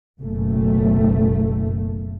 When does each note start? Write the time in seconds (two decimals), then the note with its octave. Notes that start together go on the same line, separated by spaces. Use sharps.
0.20 F#1 B1 F#2 A3